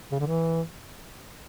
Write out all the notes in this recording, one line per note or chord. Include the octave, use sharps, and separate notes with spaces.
C#3
D3
E3